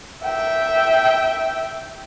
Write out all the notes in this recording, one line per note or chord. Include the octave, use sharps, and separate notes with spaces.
E5 G5